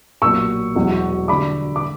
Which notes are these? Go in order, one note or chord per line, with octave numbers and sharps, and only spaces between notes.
B1 A#2 F#3 C#6 E6
E1 E2 B2 F#3
D2 D3 G3 B5 D6
D6